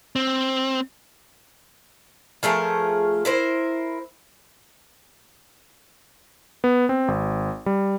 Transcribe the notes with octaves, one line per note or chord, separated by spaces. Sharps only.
C4
F3 A3 G#4 A#4
E4 A#4 C5
B3
C4
G#1
G3